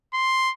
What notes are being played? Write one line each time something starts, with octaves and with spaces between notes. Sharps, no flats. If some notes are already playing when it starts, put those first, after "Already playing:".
C6